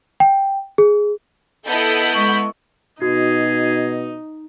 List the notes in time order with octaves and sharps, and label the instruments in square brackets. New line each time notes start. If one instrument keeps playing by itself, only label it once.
[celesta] G5
G#4
[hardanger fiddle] B3 E4 [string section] A4 D#5 F#5 [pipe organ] B5 G6
[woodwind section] G#3 C#6
[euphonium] B2 [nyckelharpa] D#4 [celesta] F#4 [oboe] G#4